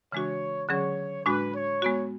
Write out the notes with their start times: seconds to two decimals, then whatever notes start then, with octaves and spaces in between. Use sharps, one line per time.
0.12 C#3 E3 G#3 D4 F#4 C#5
0.69 D3 F#3 C#4 G#4 C#5
1.25 A2 G#3 D4 F#4 B4
1.54 C#5
1.82 G#3 B3 F#4